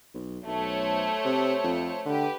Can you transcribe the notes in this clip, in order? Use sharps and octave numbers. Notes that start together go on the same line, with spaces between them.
B1
B1 A3 C5 C#5
C3
F2
D3 G4 B4